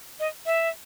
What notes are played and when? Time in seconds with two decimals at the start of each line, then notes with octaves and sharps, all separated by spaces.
0.20 D#5
0.46 E5